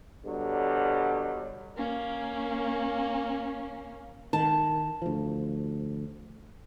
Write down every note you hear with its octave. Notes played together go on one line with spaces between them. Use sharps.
B2 D3 F#3 G3
A#3 C#4
D#3 A5
D2 F3